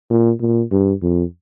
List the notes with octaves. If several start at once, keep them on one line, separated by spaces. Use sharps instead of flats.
A#2
A#2
G2
F2